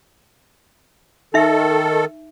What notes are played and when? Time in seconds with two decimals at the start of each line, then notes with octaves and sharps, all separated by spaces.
1.34 D#3 D#4 A4 E5